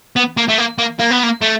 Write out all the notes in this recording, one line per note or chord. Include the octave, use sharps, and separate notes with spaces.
B3
A#3
A3
A#3
A#3
A#3
B3
A#3
A3